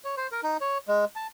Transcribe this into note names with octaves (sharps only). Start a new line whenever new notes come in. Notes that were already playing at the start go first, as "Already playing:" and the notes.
C#5
C5
A#4
D#4
C#5
G#3
A5